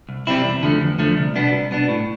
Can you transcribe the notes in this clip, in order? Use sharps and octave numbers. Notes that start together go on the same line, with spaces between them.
C2
C3 G3 C4 E4
E2
D3 F3 A3
E2
D3 F3 A3
C2
B2 B3 D4
C2
B2 B3 D4
A2